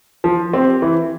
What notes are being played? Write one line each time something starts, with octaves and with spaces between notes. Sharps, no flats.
F3
C4 G4
E3